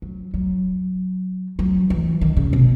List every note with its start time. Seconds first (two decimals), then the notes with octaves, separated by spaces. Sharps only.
0.02 F#3
0.34 F#3
1.59 F#3
1.90 E3
2.21 D#3
2.37 C#3
2.53 B2